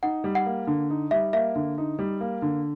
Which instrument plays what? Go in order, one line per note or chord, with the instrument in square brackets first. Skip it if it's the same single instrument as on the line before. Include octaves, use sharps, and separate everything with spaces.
[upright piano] D#4 [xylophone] F#5
[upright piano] G3
[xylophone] F#5
[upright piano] A#3
D3
D#4
[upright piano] G3 [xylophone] E5
[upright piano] A#3 [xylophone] E5
[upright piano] D3
D#4
G3
A#3
D3